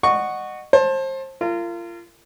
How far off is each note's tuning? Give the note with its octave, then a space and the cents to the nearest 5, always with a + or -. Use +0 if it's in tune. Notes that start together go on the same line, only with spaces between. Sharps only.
D#5 -30 F#5 +0 C#6 +0
C5 +30 A5 +0
F4 -30 A#4 -35